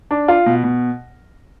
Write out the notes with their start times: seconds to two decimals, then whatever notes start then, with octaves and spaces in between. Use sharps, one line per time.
0.11 D4
0.28 F4
0.46 B2
0.64 B2